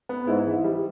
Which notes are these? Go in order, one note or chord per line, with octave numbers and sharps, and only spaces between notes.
B3
G#2 E4
E3
G3